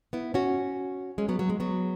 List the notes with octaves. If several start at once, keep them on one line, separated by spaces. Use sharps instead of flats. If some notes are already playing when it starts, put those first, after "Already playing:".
B3 E4
C#4 F#4
G#3 C#4
F#3 B3
F#3
G#3
F#3 B3